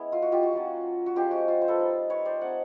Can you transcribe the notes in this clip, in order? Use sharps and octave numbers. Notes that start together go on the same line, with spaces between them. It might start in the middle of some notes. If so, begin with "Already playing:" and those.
Already playing: G#3 B3 C#4 E4
F4
F#4
F4 G4
F#4
F#3 A#3 C#4 F4
F#4
F3 G#3 C#4 F4 G4
F#4
F4
C5
A4 B4
G3 A#3 D#4
B4 C#5
C5 D5
A3 C4 D#4 F#5 G#5